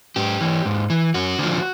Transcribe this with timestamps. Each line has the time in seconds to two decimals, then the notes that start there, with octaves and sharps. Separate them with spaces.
0.16 G#2 G4
0.41 E3
0.65 G#2
0.90 E3
1.14 F#2 F#4
1.39 D3 F3